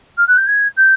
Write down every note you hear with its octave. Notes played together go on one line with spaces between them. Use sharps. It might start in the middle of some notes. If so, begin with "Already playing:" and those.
F6
F#6
G6
G#6
G6